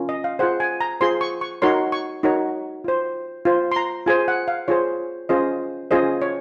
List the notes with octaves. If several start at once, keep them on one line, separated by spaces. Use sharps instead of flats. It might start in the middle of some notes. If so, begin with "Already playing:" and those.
Already playing: C#4 F4 A#4
D#5
F5
F4 G#4 C5 F#5
G#5
A#5
F4 G#4 C5 C6
C#6
C#6
D#4 F#4 A#4 C#5 C6
C#6
D#4 F#4 A#4 C#5
F4 C5
F4 C5
C6
A#5
F4 G#4 C5 G#5
F#5
F5
F4 G#4 C5 C#5
C#4 F4 G#4 C5 D#5
C#4 F4 G#4 C5 D#5
C#5